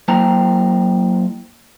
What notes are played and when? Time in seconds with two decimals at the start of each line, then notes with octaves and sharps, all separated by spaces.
0.08 F#3 A#3 E4 C5 G5 A#5